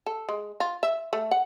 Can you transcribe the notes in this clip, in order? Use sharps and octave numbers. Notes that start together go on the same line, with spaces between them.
A4
G#3
F4
E5
A3
F#5